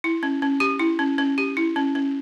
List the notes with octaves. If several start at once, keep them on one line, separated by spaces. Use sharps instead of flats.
E4
C#4
C#4
G4
E4
C#4
C#4
G4
E4
C#4
C#4